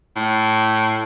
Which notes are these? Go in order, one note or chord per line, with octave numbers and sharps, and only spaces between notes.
A2